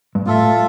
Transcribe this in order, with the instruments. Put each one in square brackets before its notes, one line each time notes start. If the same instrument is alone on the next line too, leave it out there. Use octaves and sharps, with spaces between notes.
[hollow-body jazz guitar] G2
[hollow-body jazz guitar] A2 [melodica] F4 A4 E5